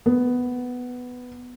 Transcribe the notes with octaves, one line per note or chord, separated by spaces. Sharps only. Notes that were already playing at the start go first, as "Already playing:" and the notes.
B3